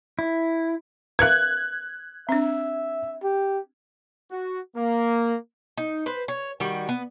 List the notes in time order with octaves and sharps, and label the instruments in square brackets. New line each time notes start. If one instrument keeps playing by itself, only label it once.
[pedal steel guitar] E4
[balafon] B4 E5 F5 [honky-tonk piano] F#6 G#6
[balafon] C4 D4 [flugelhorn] E5
[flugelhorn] G4
[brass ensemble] F#4
A#3
[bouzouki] D#4
B4 C5
C#5
D#3 G3 F#4
B3